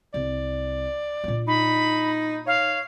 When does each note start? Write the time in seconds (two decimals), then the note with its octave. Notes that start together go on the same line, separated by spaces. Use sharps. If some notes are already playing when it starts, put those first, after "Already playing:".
0.14 C2 D5
1.24 A#2 D4
1.47 D#4 B5
2.47 C#5 F5